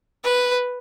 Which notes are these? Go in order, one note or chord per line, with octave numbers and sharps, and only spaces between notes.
B4